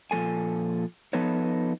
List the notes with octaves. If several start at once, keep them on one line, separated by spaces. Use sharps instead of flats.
A#2 F3 G#3 A4 G#5
F3 B3 D#4 A4 B4 C#5